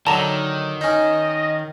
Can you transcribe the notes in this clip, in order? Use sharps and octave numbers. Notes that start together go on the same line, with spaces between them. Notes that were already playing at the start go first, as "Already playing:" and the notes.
D3 D#3 F#3 A5 A#5
C#4 D#4 D#5